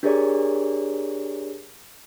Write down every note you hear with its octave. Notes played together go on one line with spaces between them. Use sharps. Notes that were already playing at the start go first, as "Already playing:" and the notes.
D4 G4 G#4 A#4 C#5 D5